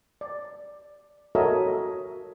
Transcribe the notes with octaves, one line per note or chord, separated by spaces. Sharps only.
D5
F#4 A4 A#4 C#5 D#5 E5